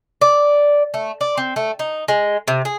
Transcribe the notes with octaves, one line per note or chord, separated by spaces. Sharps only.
D5
A3
D5
C4
A3
D#4
G#3
C3
G#4